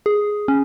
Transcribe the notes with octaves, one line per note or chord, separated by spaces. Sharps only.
G#4
C#4